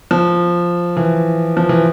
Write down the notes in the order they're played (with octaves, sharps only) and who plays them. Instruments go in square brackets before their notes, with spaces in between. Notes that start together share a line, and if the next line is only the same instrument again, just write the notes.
[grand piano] F3
E3
F3
E3